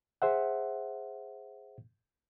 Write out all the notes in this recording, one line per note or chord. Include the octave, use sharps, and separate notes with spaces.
G#4 C5 E5 F#5